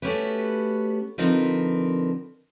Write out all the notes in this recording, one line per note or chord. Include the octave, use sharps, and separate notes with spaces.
A3 B3 C#4 F#4 G4 B4
D3 F3 C4 D#4 A#4 B4